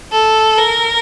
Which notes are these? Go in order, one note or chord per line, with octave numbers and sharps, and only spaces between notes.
A4
A#4